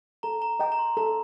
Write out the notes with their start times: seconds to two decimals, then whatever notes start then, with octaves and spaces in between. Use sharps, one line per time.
0.23 A4 A#5
0.42 A#5
0.60 D#5 G5 A#5
0.72 A#5
0.79 C6
0.97 A4 A#5